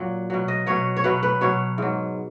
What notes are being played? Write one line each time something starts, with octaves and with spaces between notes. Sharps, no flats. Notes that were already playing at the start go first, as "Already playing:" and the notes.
Already playing: A#2 F#3
B2 F#3
D#5
B2 F#3 C#5
C#5
B2 F#3 B4
B4
B2 F#3 C#5
G#2 F#3